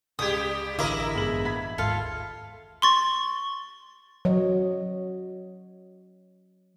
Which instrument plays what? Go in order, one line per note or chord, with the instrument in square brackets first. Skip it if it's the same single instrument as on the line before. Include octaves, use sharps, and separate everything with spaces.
[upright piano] C#2 G#6 [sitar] G3 G4 [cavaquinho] D#6
[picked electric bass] A1 D3 [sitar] E4 A#4 D#5 [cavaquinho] D6
[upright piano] G1 G#3 F#7
B5 G#6 B6
[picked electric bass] G#1 D#2 G#2 [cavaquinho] F4 A4 F5
[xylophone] C6 C#6 A6
[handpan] F#3 C#5 D#5